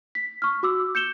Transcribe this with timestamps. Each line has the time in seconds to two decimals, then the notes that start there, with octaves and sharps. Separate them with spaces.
0.15 B6
0.42 C#6 F6
0.63 F#4 D6 E6
0.95 G6 C#7 E7 G7